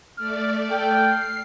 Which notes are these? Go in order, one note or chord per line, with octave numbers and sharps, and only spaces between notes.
A3 D5 F6
A4 G5
C7